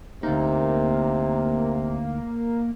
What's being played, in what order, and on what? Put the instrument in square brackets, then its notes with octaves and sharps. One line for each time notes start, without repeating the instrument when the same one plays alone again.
[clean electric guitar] D2 D#4 [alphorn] C3 [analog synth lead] A#3